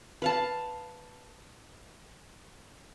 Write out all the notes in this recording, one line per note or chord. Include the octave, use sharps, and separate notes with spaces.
B4 F5 A5